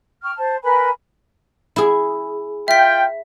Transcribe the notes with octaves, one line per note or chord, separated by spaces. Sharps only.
G5 C#6 F6
C5 A5
A#4 B4 G#5 B5
E4 G#4
F4 E5 G5 B6